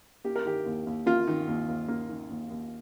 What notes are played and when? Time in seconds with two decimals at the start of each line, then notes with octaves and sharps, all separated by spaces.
0.24 A#3 G4
0.36 A#4
0.45 D#3 G4
0.66 D#2
0.87 D#2
1.06 A#3 F4
1.27 D#3
1.48 D#2
1.68 D#2
1.88 A#3
2.09 D#3
2.30 D#2
2.50 D#2